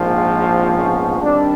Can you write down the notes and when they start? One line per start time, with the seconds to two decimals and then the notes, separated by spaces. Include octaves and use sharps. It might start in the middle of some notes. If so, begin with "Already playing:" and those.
Already playing: A#1 G#2 F3 A#3 C4
0.75 B3 C#4
1.22 D#3 G3 C4 D4